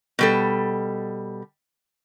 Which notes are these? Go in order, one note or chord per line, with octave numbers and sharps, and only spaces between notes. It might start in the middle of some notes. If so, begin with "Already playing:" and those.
B2 G3 A4